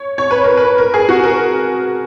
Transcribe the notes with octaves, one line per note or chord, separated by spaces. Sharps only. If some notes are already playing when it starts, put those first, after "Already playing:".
Already playing: C#5
C#5
B4
A#4
B4
A#4
G#4
F#4
A#4